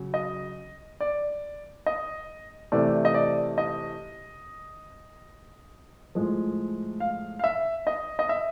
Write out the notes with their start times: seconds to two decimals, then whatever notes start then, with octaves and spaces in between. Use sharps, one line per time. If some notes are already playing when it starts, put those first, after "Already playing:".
Already playing: C#3 F#3
0.14 D#5
1.01 D5
1.86 D#5
2.72 C3 E3 A3 D5
3.05 D#5
3.14 D5
3.58 D#5
6.15 A2 F3 G#3
7.00 F5
7.39 F5
7.44 E5
7.87 D#5
8.19 D#5
8.29 E5